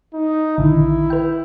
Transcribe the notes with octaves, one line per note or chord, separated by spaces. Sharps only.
D#4
A#1 D3 D#3 E4
B4 G5